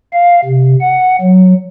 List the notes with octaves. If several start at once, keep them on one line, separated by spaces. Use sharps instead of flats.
F5
C3
F#5
F#3